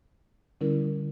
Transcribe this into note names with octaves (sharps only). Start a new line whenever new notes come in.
D3 G3 C#4 E4 A#4